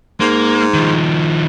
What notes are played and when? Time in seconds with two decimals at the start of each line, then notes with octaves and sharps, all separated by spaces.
0.20 G#2 A#3
0.74 D#3 F3